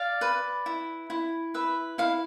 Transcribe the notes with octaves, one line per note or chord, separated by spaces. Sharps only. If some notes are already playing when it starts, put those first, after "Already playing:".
Already playing: D5 F5
B4
E4
E4
B4 E5
E4 F5